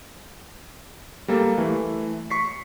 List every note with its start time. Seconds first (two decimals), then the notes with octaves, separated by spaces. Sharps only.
1.28 G3 A#3 A4
1.58 E3 A3
2.30 C#6 B6 C7